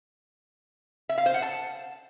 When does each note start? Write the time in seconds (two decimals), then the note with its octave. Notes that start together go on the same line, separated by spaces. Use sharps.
1.09 E5
1.18 F5
1.26 C5
1.34 F#5
1.42 A5